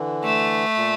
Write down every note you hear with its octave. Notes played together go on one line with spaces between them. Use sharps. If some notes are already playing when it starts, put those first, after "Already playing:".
Already playing: D3 E3
A3
A#2